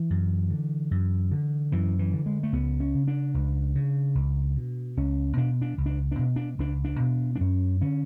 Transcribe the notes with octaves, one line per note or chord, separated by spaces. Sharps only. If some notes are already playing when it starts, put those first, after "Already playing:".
Already playing: E3
F#2
D3
F#2
D3
F#2 E3
E3
D3
G#3
A3
C#2 B3
C#4
C#3
D4
C#2
C#3
C#2
B2
C#2 C#4
B2 D4
D4
C#2
D4
D4
B2
D4
C#2 D4
D4
B2
D4
F#2 C#4
D3 C#4